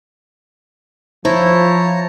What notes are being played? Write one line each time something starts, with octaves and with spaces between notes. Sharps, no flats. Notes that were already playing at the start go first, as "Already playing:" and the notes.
F3 E4 C5 C#5 A5 A#5